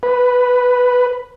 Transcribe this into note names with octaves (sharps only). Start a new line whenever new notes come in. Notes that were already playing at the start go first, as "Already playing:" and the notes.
B4